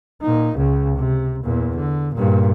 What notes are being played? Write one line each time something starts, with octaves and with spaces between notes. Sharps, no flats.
A#2 D#4
C#2 C#3
C3
E2 A#2
D3
G2 A#2